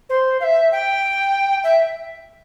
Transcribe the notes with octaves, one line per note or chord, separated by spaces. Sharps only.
C5
F5
E5
G5
E5